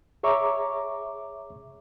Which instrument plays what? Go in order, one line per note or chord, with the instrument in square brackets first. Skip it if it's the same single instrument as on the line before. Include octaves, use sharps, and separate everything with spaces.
[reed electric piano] G#4 C#5 E5 A#5 C#6 D6